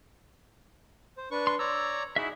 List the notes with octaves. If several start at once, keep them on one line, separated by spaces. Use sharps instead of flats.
C5
D4 B4 C#6
C6
C#5 D5 A#5 E6
D#4 E4 F#4 G#4 E5